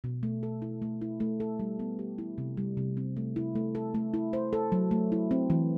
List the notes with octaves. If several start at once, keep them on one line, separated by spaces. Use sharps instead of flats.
B2
A3
A4
E4
A3
E4
A3
A4
G3
B3
G4
E4
C3
G3
C3
C4
A3
E4
A3
A4
A3
E4
C5
A4
F#3
A3
E4
C4
E3